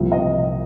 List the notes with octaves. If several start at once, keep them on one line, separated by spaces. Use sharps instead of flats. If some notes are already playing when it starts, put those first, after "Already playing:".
Already playing: C2 A#2 F3
D#5